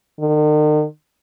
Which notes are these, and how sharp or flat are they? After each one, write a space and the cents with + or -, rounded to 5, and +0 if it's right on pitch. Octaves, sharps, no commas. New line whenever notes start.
D#3 -45